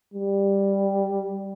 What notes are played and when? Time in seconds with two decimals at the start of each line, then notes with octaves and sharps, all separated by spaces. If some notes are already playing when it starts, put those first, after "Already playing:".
0.14 G3